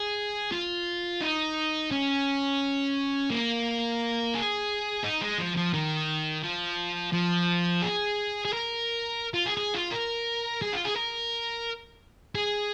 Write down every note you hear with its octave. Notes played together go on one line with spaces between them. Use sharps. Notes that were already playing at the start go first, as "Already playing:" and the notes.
Already playing: G#4
F4
D#4
C#4
A#3
G#4
D#4
G#3
F3
F3
D#3
F3
F3
G#4
G#4
A#4
F4
G#4
G#4
F4
A#4
G#4
F4
G#4
A#4
G#4